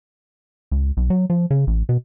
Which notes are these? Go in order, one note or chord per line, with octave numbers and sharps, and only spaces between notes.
C#2
B1
F#3
F3
C#3
A1
B2